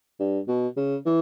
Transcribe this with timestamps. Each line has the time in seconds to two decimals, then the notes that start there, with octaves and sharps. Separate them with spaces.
0.19 G2
0.48 B2
0.77 C#3
1.06 E3